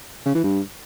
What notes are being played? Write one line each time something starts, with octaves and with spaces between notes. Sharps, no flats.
C#3
E3
G2